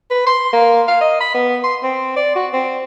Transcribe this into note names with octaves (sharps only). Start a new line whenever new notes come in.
B4
C6
A#3
F5
D#5
B5
B3
C6
C4
D5
F#4
C4